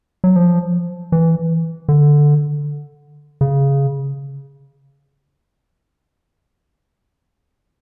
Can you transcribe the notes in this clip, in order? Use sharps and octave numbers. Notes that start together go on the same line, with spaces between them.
F#3
F3
E3
D3
C#3